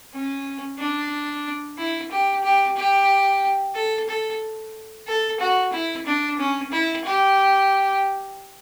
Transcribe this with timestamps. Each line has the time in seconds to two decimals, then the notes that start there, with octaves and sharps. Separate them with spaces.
0.14 C#4
0.79 D4
1.78 E4
2.11 G4
2.44 G4
2.77 G4
3.75 A4
4.09 A4
5.07 A4
5.40 F#4
5.73 E4
6.06 D4
6.38 C#4
6.72 E4
7.05 G4